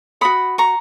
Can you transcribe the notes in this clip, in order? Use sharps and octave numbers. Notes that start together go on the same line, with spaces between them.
F#4 C#5 B5 D#6
A#5 C#6